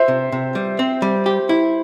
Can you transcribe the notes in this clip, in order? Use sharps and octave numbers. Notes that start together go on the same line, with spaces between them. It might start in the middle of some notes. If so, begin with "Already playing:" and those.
Already playing: C5 E5
C3
C3
G3
C4
G3
G4
E4